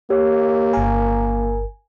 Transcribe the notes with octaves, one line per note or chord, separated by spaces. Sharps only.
A#3 G4 C#5
G1 A#4 G#5